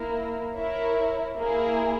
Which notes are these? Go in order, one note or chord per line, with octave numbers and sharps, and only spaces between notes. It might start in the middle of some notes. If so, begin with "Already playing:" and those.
Already playing: A#3 E4 A#4
E4 A#4 C#5 E5
A#3 E4 G#4